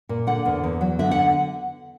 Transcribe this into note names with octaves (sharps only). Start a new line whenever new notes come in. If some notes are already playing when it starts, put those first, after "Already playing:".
A#2
D3 F#5
E2
E2
F#3
D3 E5
F#5